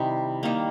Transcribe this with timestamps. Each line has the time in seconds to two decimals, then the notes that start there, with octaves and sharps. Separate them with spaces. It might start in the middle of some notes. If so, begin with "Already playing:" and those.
Already playing: C3 D#3 G3 E4
0.43 D#3 G3 A#3